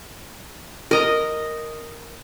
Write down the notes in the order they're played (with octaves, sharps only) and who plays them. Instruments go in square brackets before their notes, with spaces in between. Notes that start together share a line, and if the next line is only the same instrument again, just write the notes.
[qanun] A#4 D#5 A#5